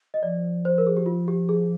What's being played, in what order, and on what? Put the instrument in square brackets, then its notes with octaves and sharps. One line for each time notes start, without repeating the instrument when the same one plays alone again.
[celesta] D#5
[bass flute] F3 [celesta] D5
[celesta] C5
A#4
G#4
G4
F4
G4
G#4